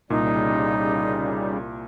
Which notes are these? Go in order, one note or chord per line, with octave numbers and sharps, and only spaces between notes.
C2 A#2 C#3 G3 D#4